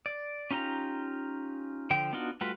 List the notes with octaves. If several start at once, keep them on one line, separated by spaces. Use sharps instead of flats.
D5
C#4 D#4 F4 G4 A#5
D3 F3 G5
B3 D4 D#4 F4 F#4
G3 A3 F4 F#4 B4